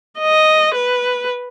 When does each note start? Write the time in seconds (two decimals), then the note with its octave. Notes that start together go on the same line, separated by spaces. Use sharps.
0.19 D#5
0.75 B4